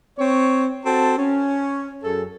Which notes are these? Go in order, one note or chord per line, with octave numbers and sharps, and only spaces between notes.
C4 C#5
C4 F#4 A4 A5
C#4
F#2 G#4 A4